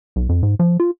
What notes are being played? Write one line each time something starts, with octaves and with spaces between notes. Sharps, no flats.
B1
F2
G#2
F3
F4